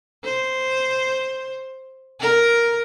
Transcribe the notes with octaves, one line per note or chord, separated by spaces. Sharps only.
C5
A#4